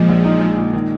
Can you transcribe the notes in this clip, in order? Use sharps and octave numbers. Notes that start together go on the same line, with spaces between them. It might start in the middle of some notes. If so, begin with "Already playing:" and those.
Already playing: A#2 F3 G#3
A#1
D#4
G#3
A#2
D#3